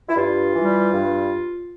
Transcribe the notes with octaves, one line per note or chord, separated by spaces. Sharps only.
E4
G2 F4
E3 G3
G2